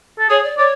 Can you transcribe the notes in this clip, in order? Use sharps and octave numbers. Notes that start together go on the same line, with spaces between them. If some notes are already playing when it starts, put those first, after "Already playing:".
A4
G#4 C#5
D5
C#5 D5